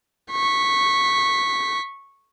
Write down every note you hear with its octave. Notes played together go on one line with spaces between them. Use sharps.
C#6 B6